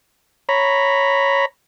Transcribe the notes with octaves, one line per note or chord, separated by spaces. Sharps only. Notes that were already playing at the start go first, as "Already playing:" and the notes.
C#5 A#5 B5